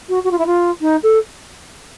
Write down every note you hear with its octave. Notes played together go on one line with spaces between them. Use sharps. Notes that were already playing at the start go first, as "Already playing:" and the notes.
F#4
F#4
F4
E4
F4
D#4
A4